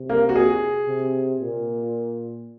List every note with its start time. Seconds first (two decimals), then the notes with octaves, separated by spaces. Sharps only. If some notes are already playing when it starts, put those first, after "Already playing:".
Already playing: C3
0.09 A#3
0.29 F#4
0.36 G#4
0.88 C3
1.40 A#2